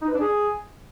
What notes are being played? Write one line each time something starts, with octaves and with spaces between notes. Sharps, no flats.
D#4
B4
D4
G#4